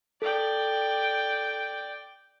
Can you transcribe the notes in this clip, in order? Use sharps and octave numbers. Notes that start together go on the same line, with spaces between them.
A4 D5 G5